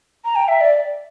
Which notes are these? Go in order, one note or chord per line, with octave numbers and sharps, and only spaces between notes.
A#5
G5
E5
D5